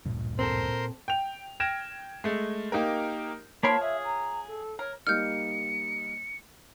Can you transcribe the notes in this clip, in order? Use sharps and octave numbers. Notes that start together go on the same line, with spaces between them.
D1 G2 A#2
C4 A4 A#4 C5 C6
G5 F7
G5 F6 G#6 A#6 D7 E7
G#3 A3
A#3 D#4 G4 A#4
F3 A#3 A#4 C#5 A5 B5 C6
G#4 E5
A#5
A4
A#4 C#5
G3 A#3 D#4 F6 G6 C#7